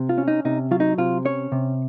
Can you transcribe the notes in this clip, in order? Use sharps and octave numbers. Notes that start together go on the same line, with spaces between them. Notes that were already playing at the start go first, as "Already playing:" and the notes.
Already playing: C3
F4
C#4
D#4
C3 D#4
F#3 F4
D#4
C3 F4
C#4 C#5
C3